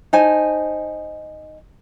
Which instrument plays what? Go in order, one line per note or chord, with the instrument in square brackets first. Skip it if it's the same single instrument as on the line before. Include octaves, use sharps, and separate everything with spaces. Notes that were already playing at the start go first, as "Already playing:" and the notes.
[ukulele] D#4 C5 G#5 A5